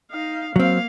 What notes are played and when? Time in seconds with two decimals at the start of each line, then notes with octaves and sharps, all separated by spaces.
0.11 D#4 F5
0.56 F#3 A#3 C4 F5